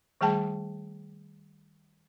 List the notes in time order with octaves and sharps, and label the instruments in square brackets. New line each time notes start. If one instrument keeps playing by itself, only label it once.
[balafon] D#3 G3 A3 G#4 G5 A5